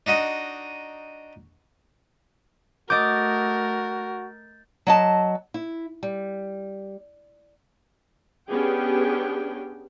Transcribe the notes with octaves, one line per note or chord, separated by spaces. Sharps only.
D4 D#4 F#4 D#5
A3 F#4 A#4 D#5 D6 G6 A6
F#3 D#5 A5
E4
G3
B3 C#4 D4 G4 G#4 G5